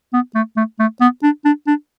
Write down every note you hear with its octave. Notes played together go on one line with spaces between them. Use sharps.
B3
A3
A3
A3
B3
D4
D4
D4